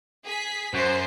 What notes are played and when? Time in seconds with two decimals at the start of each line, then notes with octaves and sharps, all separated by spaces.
0.25 G#4 B6
0.74 F#2 C5